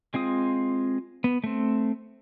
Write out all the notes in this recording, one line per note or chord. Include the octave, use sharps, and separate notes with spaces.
G#3 C4 F4 D#6
B3
A3 C4